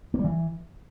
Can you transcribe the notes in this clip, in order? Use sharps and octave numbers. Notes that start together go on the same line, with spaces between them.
A#3
G3
E3